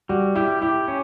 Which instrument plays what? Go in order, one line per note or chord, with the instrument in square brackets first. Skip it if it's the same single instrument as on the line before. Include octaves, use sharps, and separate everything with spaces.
[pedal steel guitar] G3 [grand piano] F#4
[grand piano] E4 [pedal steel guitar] G4
[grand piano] E4 [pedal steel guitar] G4
[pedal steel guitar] C#4